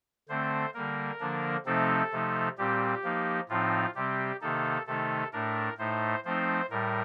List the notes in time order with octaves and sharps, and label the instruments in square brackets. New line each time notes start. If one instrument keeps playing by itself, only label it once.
[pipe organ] D3 A3 C4 C5
D3 G3 A#3 A#4
D3 F3 A#3 D4
C3 F3 A3 C4 D#4 A4
C3 F3 A3 D#4
A#2 G3 C4 G4
F3 A#3 D#4
A2 F3 C4 D#4 F4
C3 G3 C4 G4
C3 D#3 A#3 D#4 A4
C3 D#3 A3 D#4 A4
A2 A3 D4 A#4
A2 A3 D#4 C5
F3 A3 C4 D#4 C5
A2 G3 A#4